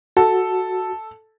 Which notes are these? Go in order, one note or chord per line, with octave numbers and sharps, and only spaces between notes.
F#4 A4